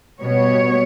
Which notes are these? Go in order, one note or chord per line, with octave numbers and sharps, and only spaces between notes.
B2 G3 B3 C#5